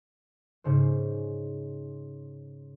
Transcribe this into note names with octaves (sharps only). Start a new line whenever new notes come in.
G#2 C#3 C5